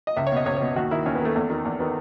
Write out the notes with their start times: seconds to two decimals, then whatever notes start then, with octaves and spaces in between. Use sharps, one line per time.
0.07 D#5
0.17 C#2 E5
0.27 C#5
0.32 B2 D#5
0.46 C#2 C#5
0.56 C#5
0.61 B2
0.76 D#2 F#4
0.91 D#3 E4
1.06 D#2 C#4
1.15 B3
1.21 D#3 A3
1.35 E2 A3
1.50 D#3
1.65 E2
1.80 D#3 B3